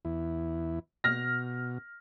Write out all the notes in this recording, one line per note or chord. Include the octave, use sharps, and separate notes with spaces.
E2 E4
B2 F6 A#6